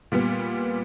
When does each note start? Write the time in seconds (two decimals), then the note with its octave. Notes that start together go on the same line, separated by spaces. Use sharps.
0.12 A#2 G3 B3